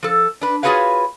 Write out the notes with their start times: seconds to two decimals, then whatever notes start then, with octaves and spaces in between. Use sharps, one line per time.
0.03 F3 A4
0.41 D4 B4
0.63 F4 F#4 G#4 B4 C#5 F5